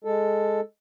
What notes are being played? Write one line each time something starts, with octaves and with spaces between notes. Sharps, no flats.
G#3 A4